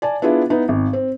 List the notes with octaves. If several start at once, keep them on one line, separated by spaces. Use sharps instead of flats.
D5 G#5 A5
B3 D4 E4 F4 G#4
B3 D#4 E4
G#1
C4